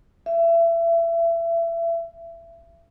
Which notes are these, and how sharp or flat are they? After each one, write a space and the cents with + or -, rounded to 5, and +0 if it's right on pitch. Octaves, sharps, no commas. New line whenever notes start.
E5 +30